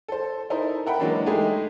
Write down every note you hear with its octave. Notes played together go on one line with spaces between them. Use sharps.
A4 C5
D#4 E4 A4 A#4 C5
A#4 E5 F#5 G5 B5
E3 F#3 G#3 A#3 C#4 D4
G#3 A3 D#4 G4 G#4